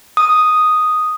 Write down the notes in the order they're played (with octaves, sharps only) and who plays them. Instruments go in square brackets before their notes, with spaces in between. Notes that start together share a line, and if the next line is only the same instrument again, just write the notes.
[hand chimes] D#6